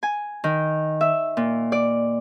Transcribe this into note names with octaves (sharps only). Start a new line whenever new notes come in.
G#5
D#3
E5
A#2
D5